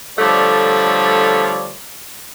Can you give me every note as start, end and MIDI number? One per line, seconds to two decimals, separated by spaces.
0.18 1.73 50
0.18 1.73 53
0.18 1.73 55
0.18 1.73 57
0.18 1.73 73
0.18 1.73 74